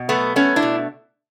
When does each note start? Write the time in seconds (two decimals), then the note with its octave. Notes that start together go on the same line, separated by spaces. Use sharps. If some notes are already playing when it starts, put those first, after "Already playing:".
Already playing: B2
0.09 F#3 A3 B3
0.36 A3 B3 C#4
0.56 D4 E4
0.62 B2